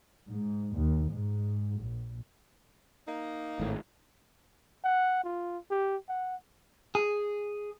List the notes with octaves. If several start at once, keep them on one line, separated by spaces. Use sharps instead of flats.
G#2
D#2
G#2
A#1
A#3 D#4
G#1 A2
F#5
F4
G4
F#5
G#4